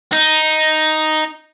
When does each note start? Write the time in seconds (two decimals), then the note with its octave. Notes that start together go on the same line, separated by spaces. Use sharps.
0.13 D#4